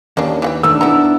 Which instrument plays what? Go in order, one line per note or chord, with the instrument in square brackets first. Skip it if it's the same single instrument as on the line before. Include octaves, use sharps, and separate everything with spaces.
[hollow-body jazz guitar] D#2 [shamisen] A#3 C#4 D4
[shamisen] E3 F#5 G5
[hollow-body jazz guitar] D#3 A3 [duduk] D4 [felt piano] E6
[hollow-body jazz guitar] B3 E4 [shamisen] D#4 D#5 A#5